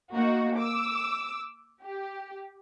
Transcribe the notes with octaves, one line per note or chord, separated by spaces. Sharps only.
A#3 D#4 F#4
D6 E6
G4